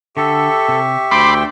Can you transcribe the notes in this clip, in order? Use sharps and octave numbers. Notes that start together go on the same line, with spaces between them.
D3 G4 A4 E5 C#6
C3
D2 A3 D4 D5 G5 B5 C6 D6